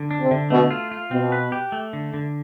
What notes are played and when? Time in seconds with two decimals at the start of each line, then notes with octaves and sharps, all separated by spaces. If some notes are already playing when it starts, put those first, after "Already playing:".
Already playing: D3
0.11 D4
0.21 C3
0.31 D3
0.50 B2 A3
0.71 F4
0.92 F4
1.11 B2 C4
1.32 B4
1.52 G4
1.72 A3
1.93 D3
2.14 D3